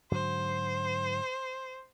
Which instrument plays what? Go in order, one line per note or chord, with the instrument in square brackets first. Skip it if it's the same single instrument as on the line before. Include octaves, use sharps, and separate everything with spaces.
[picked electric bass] G#2 D3 F#3 [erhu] C5